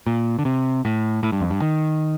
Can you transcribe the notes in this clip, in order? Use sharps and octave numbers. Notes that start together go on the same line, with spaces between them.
A#2
D3
C3
A2
A2
G2
F2
G2
D#3